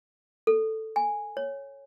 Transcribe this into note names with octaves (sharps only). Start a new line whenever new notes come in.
A4
G#5
C#5